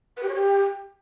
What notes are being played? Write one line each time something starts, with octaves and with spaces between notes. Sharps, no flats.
B4
G4
C#5
G4